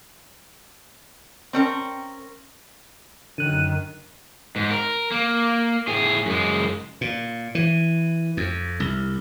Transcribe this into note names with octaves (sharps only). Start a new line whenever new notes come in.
C4 C#4 A#4
F#2 D3 D#3 F#6 D#7
G#2
A#4
A#3
A2 G#4
F#2 G#3
A#2
E3
F2
C2